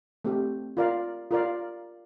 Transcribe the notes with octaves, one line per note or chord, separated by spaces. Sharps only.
A3 C4 G4
F4 A#4 D5 F5
F4 A#4 D5 F5